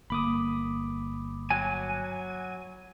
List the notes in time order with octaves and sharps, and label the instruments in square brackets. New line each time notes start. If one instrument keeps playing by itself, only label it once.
[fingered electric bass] G1 A#3 [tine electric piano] B5 D6 D#6
[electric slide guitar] F#3 G#5